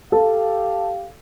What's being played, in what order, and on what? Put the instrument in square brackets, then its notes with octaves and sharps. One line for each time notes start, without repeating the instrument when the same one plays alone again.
[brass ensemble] G4 F5 [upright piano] A4